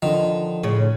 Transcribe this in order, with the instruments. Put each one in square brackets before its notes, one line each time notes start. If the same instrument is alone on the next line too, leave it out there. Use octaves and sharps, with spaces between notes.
[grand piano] D3 F3 [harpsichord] D#3
[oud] A2 C#3